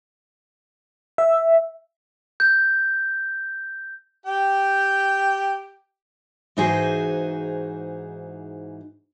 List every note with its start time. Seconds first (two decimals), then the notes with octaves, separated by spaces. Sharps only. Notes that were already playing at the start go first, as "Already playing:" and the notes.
1.18 E5
2.40 G6
4.26 G4 G5
6.57 G#2 E3 D#4 F#4 G#4 C5